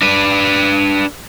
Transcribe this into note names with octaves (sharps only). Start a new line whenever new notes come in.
D4 B4